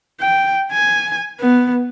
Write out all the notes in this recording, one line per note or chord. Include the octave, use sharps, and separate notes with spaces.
G5
G#5
B3